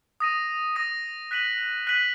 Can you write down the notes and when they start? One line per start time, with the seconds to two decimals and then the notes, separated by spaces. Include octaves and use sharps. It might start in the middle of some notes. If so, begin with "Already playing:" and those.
0.20 D#6 A#6 D#7
0.76 D#6 A#6 D#7
1.31 F#6 B6 D#7 F#7
1.87 F#6 B6 D#7 F#7